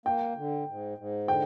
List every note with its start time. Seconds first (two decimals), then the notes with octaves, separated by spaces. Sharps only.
0.06 A#3 G5
0.36 D3
0.67 G#2
0.98 G#2
1.28 D3 G5